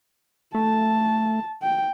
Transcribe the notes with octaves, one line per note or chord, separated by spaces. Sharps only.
A3 A5
G5